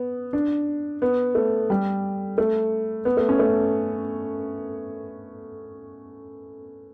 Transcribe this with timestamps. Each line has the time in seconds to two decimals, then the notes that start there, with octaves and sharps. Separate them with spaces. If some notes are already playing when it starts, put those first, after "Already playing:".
Already playing: B3
0.33 D4
1.02 B3
1.35 A3
1.70 G3
2.38 A3
3.05 B3
3.17 A3
3.29 C#4
3.39 A3